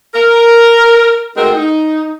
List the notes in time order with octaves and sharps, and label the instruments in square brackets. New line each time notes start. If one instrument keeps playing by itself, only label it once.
[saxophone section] A#4
G#3 A3 C4 D#4 F#4 A#4
D#4